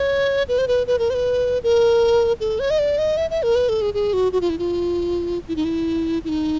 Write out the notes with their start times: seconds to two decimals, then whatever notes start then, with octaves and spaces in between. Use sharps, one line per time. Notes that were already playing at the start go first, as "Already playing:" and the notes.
Already playing: C#5
0.48 B4
0.58 C5
0.68 B4
0.87 B4
0.99 A#4
1.10 C5
1.14 B4
1.63 A#4
2.40 A4
2.60 C#5
2.70 D#5
2.79 D5
2.98 D#5
3.17 E5
3.30 E5
3.43 A#4
3.55 B4
3.69 A4
3.81 G#4
3.94 G#4
4.13 F#4
4.32 F#4
4.41 F4
4.50 E4
4.59 F4
5.48 E4
5.56 D#4
5.65 E4
6.25 E4
6.29 D#4